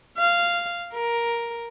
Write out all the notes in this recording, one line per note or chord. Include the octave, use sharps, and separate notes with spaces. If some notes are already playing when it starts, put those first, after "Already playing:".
F5
A#4